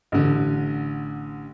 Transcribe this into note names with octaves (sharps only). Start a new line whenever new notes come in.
A1 D3